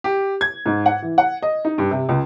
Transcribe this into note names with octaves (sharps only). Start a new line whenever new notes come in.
G4
G#6
G#2
F#5
E3
F#5
D#5
D#4
G2
C3
C#2